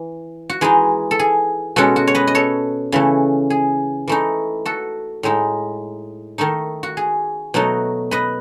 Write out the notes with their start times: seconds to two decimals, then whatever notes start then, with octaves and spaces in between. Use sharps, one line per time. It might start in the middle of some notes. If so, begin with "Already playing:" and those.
Already playing: E3
0.49 F#4
0.61 E3 G#3 D#4 G#4
1.11 A4
1.19 G#4
1.76 B2 G#3 C#4 F#4 A4
1.96 F#4
2.07 C#5
2.15 B4 D#5
2.27 D#5
2.35 A4 C#5
2.92 C#3 E3 A3
3.50 G#4
4.08 E3 A3 D#4
4.66 F#4 A4
5.23 A2 G#3 D#4
6.38 D#3 A3 D#4
6.83 F#4
6.97 G#4
7.54 B2 F#3 A3 D#4
8.11 B4 D#5